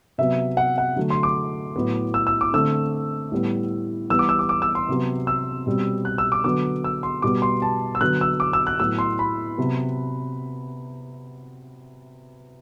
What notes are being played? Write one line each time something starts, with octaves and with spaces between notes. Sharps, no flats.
C3 F#3 B3 E5
F#5
F#5
D3 F#3 A3
C6
D6
A2 F#3 B3
E6
E6
D6
D3 A3 C4 E6
A2 G3 B3
E3 G3 B3 E6
D6
E6
D6
D6
E6
C6
C3 F#3 B3
E6
B2 G3 C4
F#6
E6
D6
D3 F#3 B3 D6
E6
C6
B2 G3 B3 D6
C6
A5
E6
D3 F#3 B3 F#6
E6
D6
E6
F#6
A2 F#3 B3 E6
C6
B5
C3 F#3 B3